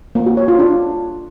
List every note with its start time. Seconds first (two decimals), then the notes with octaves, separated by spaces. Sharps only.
0.15 A#3
0.26 F#4
0.37 C#5
0.48 F4
0.59 D4